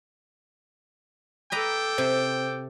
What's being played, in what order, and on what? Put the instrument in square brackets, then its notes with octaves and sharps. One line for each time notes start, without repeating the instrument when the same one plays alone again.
[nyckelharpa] A4 D6 [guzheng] B4 D#5 A#5 [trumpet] G5
[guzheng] C3 [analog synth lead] C5